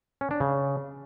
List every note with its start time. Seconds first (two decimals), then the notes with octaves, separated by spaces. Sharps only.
0.21 C#4
0.31 D4
0.40 C#3